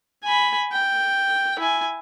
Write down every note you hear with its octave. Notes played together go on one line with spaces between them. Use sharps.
G#5 B5
G5
E4 G#5